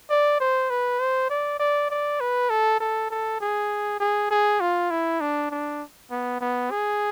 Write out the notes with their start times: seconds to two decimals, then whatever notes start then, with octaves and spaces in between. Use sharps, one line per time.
0.10 D5
0.40 C5
0.70 B4
1.00 C5
1.30 D5
1.60 D5
1.90 D5
2.20 B4
2.50 A4
2.80 A4
3.11 A4
3.41 G#4
4.00 G#4
4.31 G#4
4.61 F4
4.91 E4
5.21 D4
5.51 D4
6.11 B3
6.41 B3
6.71 G#4